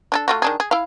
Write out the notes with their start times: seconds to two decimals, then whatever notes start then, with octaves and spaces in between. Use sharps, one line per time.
0.12 D4 G#4 A4
0.28 A3 F4 F#4
0.42 D#3 D4 G#4
0.60 G#4
0.71 E4 F5